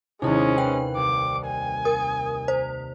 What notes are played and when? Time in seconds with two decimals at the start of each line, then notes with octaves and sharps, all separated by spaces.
0.22 D#2 C3 G#3 C#4 D#4 E4
0.58 B4 G5
0.97 C2 D6
1.46 G#5
1.85 A#4 D#6
2.48 C5